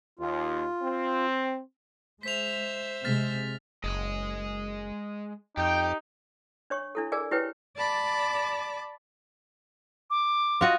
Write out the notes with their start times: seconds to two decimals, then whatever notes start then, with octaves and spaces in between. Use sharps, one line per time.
0.19 D#2 F4
0.83 C4
2.23 G#3 C5 E5 B6 F7
3.04 C3 G#3 F6 A6 B6
3.84 F#1 G#3 D#5
5.57 F2 D#4 G4 G5
6.70 D4 C#5 C#6
6.95 D4 E4 A4
7.12 G#4 A#4 D5 G#5
7.31 E4 G4 B4 C#5 G5
7.75 D5 A5 B5 D6
10.10 D6
10.61 F4 F#4 D#5